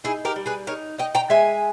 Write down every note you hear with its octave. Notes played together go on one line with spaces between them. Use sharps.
D#4 E4 G#4
G4 A#4
G3
G#4 B4
D#4 A#4 C#5
D#4 D#5 G5
G5 A#5
G#3 E5 G#5